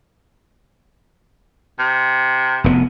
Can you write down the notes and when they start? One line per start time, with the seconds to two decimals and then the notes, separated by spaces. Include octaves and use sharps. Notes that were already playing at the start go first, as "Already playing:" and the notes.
1.79 C3
2.64 F1 G#2 B3